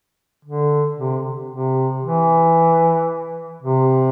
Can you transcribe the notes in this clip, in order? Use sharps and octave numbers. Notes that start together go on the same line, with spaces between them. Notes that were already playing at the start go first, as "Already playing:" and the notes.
D3
C3
C3
E3
C3